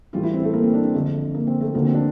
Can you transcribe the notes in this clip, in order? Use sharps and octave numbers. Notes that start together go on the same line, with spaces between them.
A2 E3 G3 F4
E4
C4
A3
A#3
C4
D4
C4
F2 D3 F3 A3
A#3
C4
A3
D2 D3 F3 A#3
C4
D4